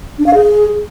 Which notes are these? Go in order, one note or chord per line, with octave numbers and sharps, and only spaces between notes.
D4
F5
G#4